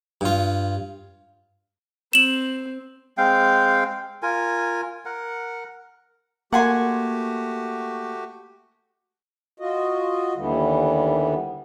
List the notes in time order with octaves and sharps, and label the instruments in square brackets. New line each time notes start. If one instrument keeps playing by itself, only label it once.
[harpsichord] G2 F4
[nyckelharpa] C4 [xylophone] E7 F#7
[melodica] G#3 C4 F5 G5
F4 A#4 G#5
A#4 F#5
[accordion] A3 F#4 G4 [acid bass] A#3 [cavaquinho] F#5 G#5 C6
[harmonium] F4 F#4 D#5
D#2 D3 E3 G3 B3